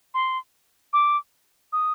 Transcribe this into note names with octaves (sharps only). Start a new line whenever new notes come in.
C6
D6
D#6